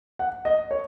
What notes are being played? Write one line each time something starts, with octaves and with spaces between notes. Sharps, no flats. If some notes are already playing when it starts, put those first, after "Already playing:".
F#5
D#5
C#5